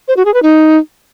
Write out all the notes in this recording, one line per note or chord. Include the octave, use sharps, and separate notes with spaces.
C5
F#4
G#4
B4
D#4